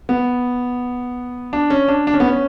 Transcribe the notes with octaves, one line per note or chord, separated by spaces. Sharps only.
B3
D4
C#4
D4
D4
C#4
B3
C#4